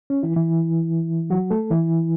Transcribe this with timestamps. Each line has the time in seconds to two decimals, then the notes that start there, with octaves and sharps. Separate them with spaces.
0.10 C#4
0.23 E3 E4
0.36 E3 E4
1.30 F#3 F#4
1.51 A3 A4
1.71 E3 E4